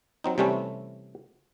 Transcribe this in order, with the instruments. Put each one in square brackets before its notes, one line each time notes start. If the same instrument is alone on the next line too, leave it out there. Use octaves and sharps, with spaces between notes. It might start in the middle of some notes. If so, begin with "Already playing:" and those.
[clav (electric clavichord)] F#3 C4 D#4
C3 E3 G3 A3 C4 C#4